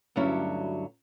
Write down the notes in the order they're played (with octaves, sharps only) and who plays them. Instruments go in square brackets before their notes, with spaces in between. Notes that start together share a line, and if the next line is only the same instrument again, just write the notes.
[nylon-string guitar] D2 G2 F#3 C#4 E4